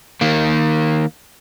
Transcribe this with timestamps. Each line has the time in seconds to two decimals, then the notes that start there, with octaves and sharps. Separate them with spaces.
0.21 D#3 A#3